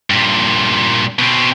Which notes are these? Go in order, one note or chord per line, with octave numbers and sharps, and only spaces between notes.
G2 A#2
B2 C4